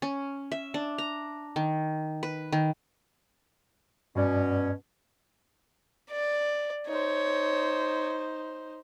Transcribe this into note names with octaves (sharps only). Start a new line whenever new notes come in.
C#4
E5
D4
A#5
D#3
B4
D#3
G2 B2 C#4 D5
D5
D#4 C5 C#5